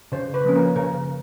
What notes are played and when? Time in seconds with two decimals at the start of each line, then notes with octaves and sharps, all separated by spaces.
0.12 C#3 C5
0.34 B4
0.45 F3 A#3 C#4
0.56 A#4
0.76 C#3 A#4